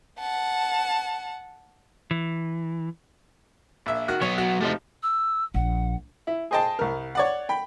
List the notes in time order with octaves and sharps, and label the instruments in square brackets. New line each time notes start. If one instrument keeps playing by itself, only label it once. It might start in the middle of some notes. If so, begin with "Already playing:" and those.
[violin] F#5 A5
[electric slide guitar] E3
[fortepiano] A#1 E5
D#3 F#4 F#6
[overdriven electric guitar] F#3 B3 [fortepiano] C#5
[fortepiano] F#4
[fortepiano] C3 F3 D#4 [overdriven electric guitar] A3 C5
[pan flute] E6
[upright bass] A#1 [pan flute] F#5
[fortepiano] E4
G#4 C5 D#5 G5 A5
C2 A#4
C#5 D5 F#5
G5 B5